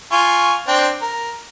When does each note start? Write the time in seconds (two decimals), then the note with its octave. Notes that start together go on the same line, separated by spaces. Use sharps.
0.12 F4 G#5 C#6
0.68 C4 D4 G5
1.02 A#4